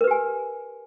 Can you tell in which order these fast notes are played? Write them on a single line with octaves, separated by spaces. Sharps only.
A#4 B4 G4 G#5